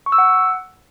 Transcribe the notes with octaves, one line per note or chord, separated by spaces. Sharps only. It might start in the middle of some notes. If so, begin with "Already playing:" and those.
C#6
E6
F#5